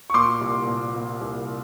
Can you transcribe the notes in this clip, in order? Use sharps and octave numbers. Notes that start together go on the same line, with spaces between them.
C#6
A#2 C6 D6
C2
A#2
A#2
C2